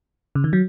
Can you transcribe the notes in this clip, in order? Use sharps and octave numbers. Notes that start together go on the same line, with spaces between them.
C#3
D#3
F#3